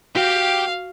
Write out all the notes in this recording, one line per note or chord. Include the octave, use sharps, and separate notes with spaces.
F#4 G4 F5 G5